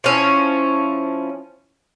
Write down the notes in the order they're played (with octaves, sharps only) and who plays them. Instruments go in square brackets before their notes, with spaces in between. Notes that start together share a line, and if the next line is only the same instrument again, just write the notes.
[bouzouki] F3 C#4 E4